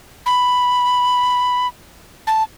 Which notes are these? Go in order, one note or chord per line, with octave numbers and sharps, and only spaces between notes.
B5
A5